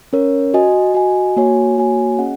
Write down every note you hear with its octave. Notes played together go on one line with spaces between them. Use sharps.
C#4 A#4 C#5
F#4 D#5 G#5
F#4 D#5 G#5
A#3 F#4 C#5 G#5
A#3 F#4 C#5 G#5
C#4 G#4 D#5 F#5